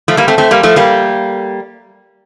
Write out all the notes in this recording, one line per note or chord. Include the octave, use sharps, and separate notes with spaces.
F3 A3
G3 A#3
A3 C4
A3 C4
G3 A#3
F3 A3
G3 A#3